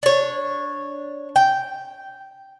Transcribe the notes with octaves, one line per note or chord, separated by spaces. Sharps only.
D4 C#5
G5